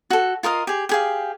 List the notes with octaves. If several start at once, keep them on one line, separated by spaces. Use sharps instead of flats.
F#4 A4
F4 A#4 D#5 F5
G4 G#4
G4 G#4 F5